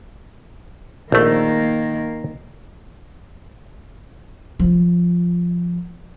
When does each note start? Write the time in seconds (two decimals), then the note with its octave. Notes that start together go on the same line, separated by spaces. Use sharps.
1.12 A#1 D#3 A3 A#3
4.60 F3 F4